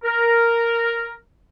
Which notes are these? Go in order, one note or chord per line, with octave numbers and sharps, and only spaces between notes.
A#4